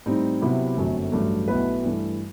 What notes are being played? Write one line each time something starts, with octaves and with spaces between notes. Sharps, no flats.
A2 G3 C4 D#4
C3 F#3 B3 E4 G4
G1 F#2 F#3 A3 C4
A1 G2 F#3 A3
B1 B2 A3 E4 B4
G2 E3 A3